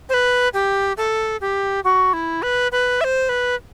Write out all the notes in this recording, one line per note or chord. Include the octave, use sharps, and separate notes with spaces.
C5
B4
G4
A4
G4
F#4
E4
B4
B4
E5
C5
B4